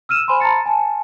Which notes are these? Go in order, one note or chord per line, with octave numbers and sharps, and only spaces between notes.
E6 F6 D#7 E7
C5 G#5 B5 C6
A5 A#5 A6 C#7
G#5 A5